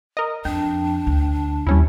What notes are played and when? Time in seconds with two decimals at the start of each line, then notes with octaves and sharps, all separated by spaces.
0.17 A#4 D#5
0.45 F2 D4 G5
1.07 D2
1.67 D#2 G3 C#4 E4